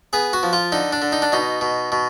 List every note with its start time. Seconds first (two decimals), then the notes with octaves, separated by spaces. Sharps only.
0.13 B3 G#4
0.33 F#4
0.43 F3
0.53 F4
0.72 D3 D#4
0.92 D4
1.02 D3
1.12 D#4
1.22 D4
1.32 B2 D#4
1.61 B2
1.92 B2